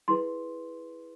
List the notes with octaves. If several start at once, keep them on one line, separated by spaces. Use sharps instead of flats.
E4 G#4 B4 C6